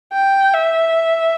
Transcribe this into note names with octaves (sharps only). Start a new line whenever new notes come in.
G5
E5